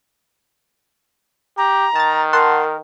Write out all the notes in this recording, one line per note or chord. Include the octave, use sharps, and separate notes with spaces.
G4 A#5
D#3 A5 A6
A#4 F#5 A5 C6